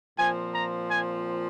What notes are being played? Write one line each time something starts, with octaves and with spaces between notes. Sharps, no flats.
A#2 F3 C4 G#5
A#5
G#5